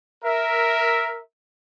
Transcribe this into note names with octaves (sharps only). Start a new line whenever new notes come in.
A#4 E5